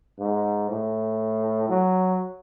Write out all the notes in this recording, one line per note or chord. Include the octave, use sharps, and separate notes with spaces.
G#2
A2
F#3